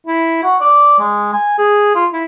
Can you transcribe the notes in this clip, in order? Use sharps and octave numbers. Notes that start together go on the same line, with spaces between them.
E4
F#4
D5
G#3
G#5
G#4
F4
E4